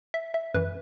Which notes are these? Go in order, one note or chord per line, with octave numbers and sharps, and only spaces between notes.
E5
E5
F#2 E3 B4